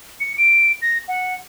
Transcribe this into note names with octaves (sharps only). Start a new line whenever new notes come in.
C#7
D7
A#6
F#5